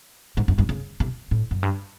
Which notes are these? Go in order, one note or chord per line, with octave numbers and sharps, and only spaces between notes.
G#2
F#2
G2
C#3
C3
A2
F#2
G2